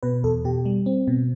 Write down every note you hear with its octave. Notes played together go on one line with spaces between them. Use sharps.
B2 B4
E2 A4
B2 G4
G3
C4
B2